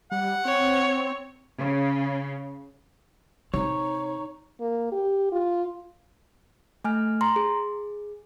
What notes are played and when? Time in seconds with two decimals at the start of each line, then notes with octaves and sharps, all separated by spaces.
0.11 G3 F#5
0.45 C4 C#5
1.58 C#3
3.54 C3 D#4 C#5
4.60 A#3
4.92 G4
5.32 F4
6.84 A3 G#5 F6
7.21 A#5 C6
7.36 G#4